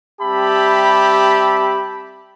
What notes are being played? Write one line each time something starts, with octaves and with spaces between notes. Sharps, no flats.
G3 C4 G4 E5 A5 B5